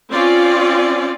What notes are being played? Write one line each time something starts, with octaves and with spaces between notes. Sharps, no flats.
C4 C#4 F4 D5